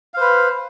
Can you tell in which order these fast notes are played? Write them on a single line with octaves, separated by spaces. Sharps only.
F5 C5 B4